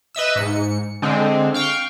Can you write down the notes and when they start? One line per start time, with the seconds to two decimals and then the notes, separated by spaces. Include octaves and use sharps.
0.15 B4 D#5 E5 E6
0.35 G#2 C#7
1.02 D3 G#3 C4
1.54 F5 G5 C#6